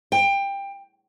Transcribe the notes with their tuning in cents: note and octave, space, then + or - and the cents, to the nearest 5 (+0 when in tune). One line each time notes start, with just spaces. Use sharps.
G5 +20